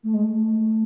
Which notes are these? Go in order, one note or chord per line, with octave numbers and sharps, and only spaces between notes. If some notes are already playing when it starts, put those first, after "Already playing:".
A3
G#3
A3